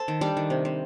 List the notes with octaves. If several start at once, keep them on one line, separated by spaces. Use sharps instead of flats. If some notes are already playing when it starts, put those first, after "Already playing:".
Already playing: A4 C5
D#3
G3 D4
D#3
C3
C3